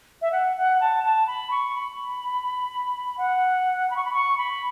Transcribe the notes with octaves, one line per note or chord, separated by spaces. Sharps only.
E5
F#5
F#5
A5
A5
B5
C#6
B5
F#5
B5
C#6
B5
C#6
B5